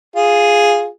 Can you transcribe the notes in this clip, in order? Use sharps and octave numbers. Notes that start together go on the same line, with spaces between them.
F4 G#4